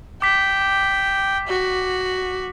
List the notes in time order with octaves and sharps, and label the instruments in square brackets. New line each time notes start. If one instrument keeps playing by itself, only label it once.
[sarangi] G5 [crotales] D6 B6
[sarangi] F#4